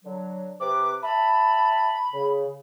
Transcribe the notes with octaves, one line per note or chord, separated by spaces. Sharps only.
D3 F#3
C3 B4 D6
E5 A5 B5
C#3